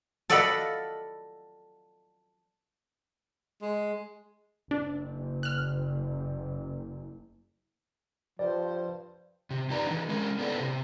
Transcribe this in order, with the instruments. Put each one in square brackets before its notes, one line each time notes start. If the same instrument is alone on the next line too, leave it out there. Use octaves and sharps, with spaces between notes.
[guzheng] A4 D5 D#5 F5 F#5 B5
[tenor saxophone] G#3
[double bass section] F#1 [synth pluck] D4
[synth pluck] F6 F#6
[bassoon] G2 [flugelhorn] F3 [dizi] C5 [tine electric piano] D5
[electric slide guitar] C3
F2 D#4 G4 B4 D5 A#5
E3 G3 D4
G#3 C#4 A#4
B3 D4 E4 A4 B4 C5
C3